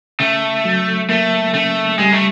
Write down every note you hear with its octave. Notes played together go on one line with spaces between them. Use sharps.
C#3 A3
F#3
A3 A#3
C#3 A3
G3 G#3
A3